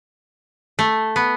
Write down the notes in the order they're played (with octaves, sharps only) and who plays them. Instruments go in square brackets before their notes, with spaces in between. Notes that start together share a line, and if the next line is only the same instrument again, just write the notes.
[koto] A3
B3